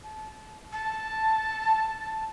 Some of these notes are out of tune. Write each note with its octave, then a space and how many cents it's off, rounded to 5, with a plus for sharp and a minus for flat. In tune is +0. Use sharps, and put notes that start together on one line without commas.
A5 -20
A5 +0